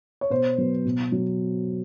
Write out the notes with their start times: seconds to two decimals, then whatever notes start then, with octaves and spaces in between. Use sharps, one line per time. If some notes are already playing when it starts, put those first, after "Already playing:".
0.21 C#5
0.30 B2 C5
0.58 F#3 B3
0.85 B2
1.12 F#3